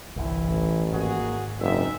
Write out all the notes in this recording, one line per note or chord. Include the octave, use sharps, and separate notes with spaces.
G1 C2 E3 E4
A1
G#1 A#3 F#4 G#4
F#1 G#3 C4 D#4 E5